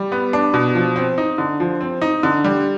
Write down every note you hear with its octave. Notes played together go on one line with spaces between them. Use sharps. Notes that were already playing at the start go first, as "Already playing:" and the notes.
Already playing: G3
B3
D4
B2
F3
C4
D#4
D3
F3
C4
D#4
D3
G3